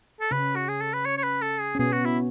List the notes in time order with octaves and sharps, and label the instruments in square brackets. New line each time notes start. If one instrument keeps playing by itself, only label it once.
[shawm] A4
[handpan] C#3 C#4 [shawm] B4
[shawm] F#4
G#4
A4
B4
C#5
C#5
B4
A4
G#4
[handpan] C#4
[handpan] B2 B3 [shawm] G#4
[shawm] F#4
E4